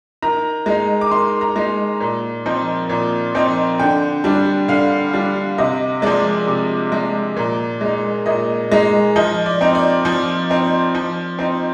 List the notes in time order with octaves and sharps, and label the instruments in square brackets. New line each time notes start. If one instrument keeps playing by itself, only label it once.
[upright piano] D#3 A#5
G#3 D#4
D6
D#3 C6
A#5
G#3 D#4
A#2
F3 C4 D#4
A#2
F3 C4 D#4
D3 G5
G3 D4
D3 F5
G3 D4
C3 D#5
F3 G#3 D5
C3
F3 G#3
A#2
G#3 D#4
A#2 D#5
G#3 D#4
F3 D#5
D5
C4 D#4
D5
F3
C4 D#4
F3
C4 D#4